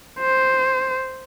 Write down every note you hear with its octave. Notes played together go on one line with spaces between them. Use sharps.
C5